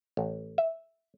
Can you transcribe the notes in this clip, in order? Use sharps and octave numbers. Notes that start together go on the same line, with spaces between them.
A1
E5